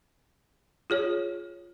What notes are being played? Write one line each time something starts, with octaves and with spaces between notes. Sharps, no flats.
F4 G#4 C#5